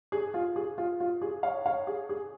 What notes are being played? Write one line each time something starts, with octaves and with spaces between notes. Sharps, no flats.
G#4
F4
G#4
F4
F4
G#4
C#5 F5
C#5 F5
G#4
G#4